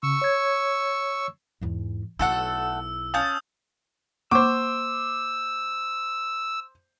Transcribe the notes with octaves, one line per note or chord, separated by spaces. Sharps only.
C#3 C#6 E6
C#5 G#6
E2 G#2
B1 A3 E4 A4 F#5 E6
C#4 F5 A5 D#6 G6
A#3 C5 C#6 D6 E6